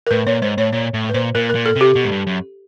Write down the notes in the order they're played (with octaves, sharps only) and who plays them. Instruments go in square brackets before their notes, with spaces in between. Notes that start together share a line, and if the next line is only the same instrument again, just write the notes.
[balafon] A#4
[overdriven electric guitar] A2 [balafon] B4
[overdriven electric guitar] A#2 [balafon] C#5
[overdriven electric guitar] G#2 [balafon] C5
[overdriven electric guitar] A2 [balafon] C#5
[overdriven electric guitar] A#2 [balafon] C#5
[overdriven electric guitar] A2
[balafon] B4
[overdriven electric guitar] A#2 [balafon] C5
[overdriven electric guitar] A#2 [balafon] A#4
[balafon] A#4
[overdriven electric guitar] A#2
[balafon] A4
[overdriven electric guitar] C3 [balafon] G4
[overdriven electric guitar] B2
G#2
G2
F#2